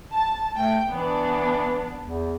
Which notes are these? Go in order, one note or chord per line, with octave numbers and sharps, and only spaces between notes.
A5
A3 G5
E3 B3 D4
E2